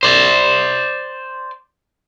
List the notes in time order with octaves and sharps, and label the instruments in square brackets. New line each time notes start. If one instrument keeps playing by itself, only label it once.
[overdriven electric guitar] C5 D5